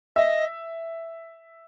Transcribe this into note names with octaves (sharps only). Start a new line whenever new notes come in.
D#5 E5